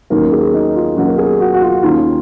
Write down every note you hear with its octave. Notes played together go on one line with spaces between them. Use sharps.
D#2 D#3 F#3 A#3 C#4 A#4
G#4
D#4
F4
D#2 D#3 F#3 A#3 C#4 F#4
A#4
G#4
F#4
F#4
F4
D#2 D#3 A#3 C#4 F4